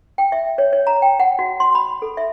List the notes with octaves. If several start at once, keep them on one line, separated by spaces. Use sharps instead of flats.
G5
E5
C#5
C#5
A#5
G5
F#5
F#4
C6
B5
A4
E5